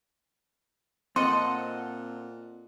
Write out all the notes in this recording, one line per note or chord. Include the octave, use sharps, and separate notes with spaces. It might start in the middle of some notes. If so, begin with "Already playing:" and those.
A#2 C4 A4 D#5 F#5 C6